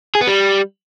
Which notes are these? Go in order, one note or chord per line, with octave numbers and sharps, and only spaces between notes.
G#4
B3
G3